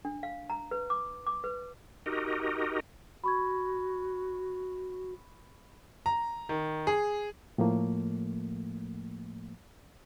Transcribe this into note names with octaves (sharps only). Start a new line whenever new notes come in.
D4
F5
A#5
B4
D6
D6
B4
D#4 F#4 G4 A#4 D#5
F#4 B5 C#6 G#6
A#5
D#3
G#4
A2 F3 A3 A#3